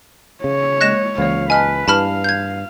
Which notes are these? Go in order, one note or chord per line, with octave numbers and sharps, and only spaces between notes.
C#3 C#5
G#3 A#3 D#5 F#6 A#6 E7
C#2 E3 A#3 C#5 D5 F5
B4 D#5 G#5 A5 F6
G2 E4 B4 F5 A5 B5 F6
G6 G#6